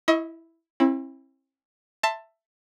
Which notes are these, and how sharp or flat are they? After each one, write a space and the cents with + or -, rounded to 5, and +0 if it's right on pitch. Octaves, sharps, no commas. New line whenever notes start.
E4 +0 D#5 +35 C#6 -15
C4 +45 E4 +0
E5 +10 A5 +15 C6 +0